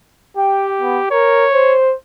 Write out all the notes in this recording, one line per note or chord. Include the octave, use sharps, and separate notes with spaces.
G4 G5
B3
A#4 C#5
C5